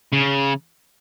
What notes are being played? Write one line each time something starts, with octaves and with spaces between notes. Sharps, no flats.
C#3